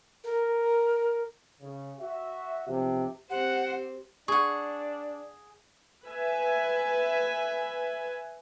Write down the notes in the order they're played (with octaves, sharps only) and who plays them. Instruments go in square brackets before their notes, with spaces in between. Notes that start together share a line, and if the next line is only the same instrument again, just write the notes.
[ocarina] A#4
[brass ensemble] C#3
F#4 E5
[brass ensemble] B1 F3 [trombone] C3
[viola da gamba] C4 C5 [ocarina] G4 [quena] F#5
[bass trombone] D4 [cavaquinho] G#4 F#5 [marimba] C#6
[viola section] B4 E5 G#5